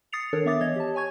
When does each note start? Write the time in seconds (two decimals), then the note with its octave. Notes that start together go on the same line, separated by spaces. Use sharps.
0.13 D#6 A6 C7 C#7 F7
0.33 D#3 D4 A4 A#4 C#5
0.46 B3 E5 D6 D#6 A6
0.61 E3 C#5 D#5 G#6
0.76 G4 A5
0.95 C#5 G#5 C#6 G#6